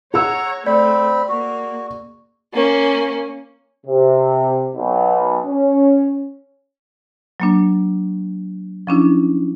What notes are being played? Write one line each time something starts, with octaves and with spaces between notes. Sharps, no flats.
G#4 C#5 F#5 A#5 E6
A3 C4 D5 B5
A#3 F#4
A#3 C#4
C3
B1
C#4
F#3 A#3 D4
F3 C#4 D4 E4